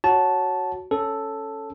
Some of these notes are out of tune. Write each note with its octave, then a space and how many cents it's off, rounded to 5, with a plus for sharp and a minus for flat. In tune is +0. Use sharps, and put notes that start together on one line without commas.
F#4 +5 C#5 -5 A5 -5
C#4 +0 A4 +0